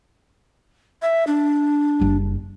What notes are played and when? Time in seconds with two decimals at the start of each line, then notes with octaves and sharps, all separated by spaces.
1.02 E5
1.27 D4
2.00 F#1 G3